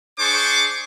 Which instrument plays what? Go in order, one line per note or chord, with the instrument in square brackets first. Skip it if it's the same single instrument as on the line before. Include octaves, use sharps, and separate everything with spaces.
[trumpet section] D4 G#4 C5 C#6 D6